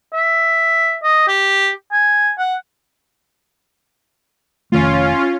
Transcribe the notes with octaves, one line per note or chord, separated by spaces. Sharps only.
E5
D#5
G4
G#5
F#5
F1 D#3 A3 C#4 F4